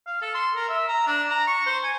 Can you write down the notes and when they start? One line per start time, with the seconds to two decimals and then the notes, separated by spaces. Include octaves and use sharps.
0.07 F5
0.22 A4
0.35 C6
0.56 A#4
0.69 E5
0.88 A#5
1.07 D4
1.30 A#5
1.47 C#6
1.66 C5
1.84 G#5